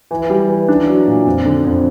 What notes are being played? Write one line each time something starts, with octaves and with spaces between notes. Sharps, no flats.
E3
G3
E3
D4
F#3
A#2
F2
D3
F2